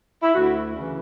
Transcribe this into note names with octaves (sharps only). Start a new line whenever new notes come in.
E4
D2 F#4
C#3 E3